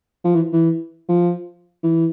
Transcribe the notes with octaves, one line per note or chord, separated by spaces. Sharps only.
F3
E3
E3
F3
E3